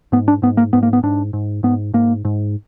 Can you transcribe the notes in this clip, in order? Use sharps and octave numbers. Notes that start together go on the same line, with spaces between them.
G#2 B3
D4
G#2 B3
A#3
G#2 B3
A#3
B3
G#2 D4
G#2
G#2 B3
G#2 A#3
G#2